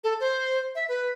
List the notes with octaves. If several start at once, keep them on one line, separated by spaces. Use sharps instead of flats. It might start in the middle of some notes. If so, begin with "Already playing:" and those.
A4
C5
E5
B4